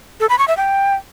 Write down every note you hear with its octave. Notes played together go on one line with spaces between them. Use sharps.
A4
B5
C#6
E5
G5